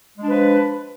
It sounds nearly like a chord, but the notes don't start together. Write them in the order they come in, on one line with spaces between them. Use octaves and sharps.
G#3 D4 B4 F3